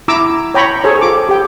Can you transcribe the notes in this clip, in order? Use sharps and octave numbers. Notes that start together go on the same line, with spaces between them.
E4 A#5 D6 E6
C#5 G5 A#5 B5 C#6
G#4 A4 C5 C#5
F4 D6
G4 G5